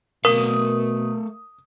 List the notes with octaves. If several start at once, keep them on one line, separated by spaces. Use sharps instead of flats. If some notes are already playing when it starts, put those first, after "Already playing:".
B2 A3 A#4 F5 D#6